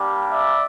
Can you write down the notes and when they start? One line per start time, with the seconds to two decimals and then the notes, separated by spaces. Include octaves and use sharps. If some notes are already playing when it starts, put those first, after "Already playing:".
Already playing: G3 A#3 D4 G4
0.31 D5 E5